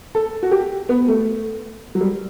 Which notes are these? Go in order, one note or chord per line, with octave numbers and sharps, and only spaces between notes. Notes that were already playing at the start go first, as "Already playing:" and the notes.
A4
F#4
G4
B3
A3
F#3
G3